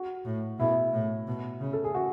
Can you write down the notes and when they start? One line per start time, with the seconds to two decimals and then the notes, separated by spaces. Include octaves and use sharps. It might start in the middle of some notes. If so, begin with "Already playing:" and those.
Already playing: F#4
0.25 A2
0.59 B2 E4
0.93 A2
1.27 B2
1.61 C#3
1.73 A4
1.84 G#4
1.95 F#4